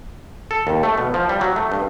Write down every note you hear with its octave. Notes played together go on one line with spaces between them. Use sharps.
A4
D#2
A3
B2
F3
G3
F#3
A3
G2